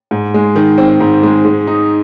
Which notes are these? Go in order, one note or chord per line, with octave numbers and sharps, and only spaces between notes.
G#2
G#3
D#3
C4
G#2
G#3
G#3
D#4